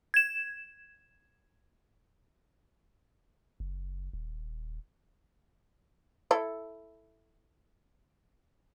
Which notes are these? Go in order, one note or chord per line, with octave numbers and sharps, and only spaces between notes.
G#6 E7
F#1
D#1
E4 A4